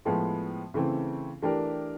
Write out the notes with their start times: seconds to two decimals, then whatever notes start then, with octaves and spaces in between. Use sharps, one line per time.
0.05 A2 F3 G#3 B3
0.74 C#3 E3 A3 C4
1.42 E3 A3 D4 G4 A#4